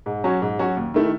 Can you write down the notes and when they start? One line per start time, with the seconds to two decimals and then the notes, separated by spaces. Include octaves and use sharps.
0.06 G#2
0.24 F#3 C#4 F#4
0.42 G#2
0.59 F#3 C#4 F#4
0.77 D#2
0.94 D#3 A3 E4